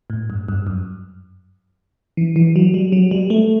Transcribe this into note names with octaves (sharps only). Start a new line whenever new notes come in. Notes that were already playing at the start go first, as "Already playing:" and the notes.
A2
G2
G2
F#2
E3
E3
F#3
G3
F#3
G3
A3